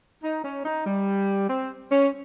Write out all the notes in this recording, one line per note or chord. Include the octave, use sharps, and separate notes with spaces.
D#4
C#4
D#4
G3
C4
C#4